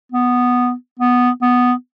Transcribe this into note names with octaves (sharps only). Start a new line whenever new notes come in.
B3
B3
B3